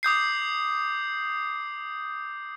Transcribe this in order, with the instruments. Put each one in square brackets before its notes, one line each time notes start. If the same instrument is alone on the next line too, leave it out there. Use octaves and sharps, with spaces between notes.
[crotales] D6 D#6 G6 C7